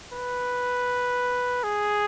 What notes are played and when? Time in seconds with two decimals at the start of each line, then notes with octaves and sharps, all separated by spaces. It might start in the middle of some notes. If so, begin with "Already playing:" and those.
0.12 B4
1.64 G#4